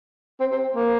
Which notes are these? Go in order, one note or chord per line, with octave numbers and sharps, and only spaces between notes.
C4
C4
A#3